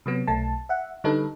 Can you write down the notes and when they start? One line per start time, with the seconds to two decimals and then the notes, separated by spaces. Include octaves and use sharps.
0.06 C3 F#3 B3
0.27 B1 A3 A5
0.69 E5 F#5
1.04 D3 G3 D#4 A4 B4